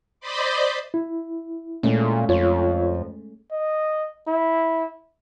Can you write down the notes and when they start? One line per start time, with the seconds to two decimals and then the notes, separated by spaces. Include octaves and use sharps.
0.20 C5 D5 D#5 B5 C6 D6
0.94 E4
1.83 A#2 G#3 A3 C#4
2.29 F2 F4 C#5
3.52 D#5
4.27 E4